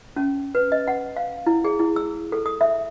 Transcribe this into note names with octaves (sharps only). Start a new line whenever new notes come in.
C#4
B4
D#5
F#5
F5
E4
G#4
E4
E6
A4
D#6
E5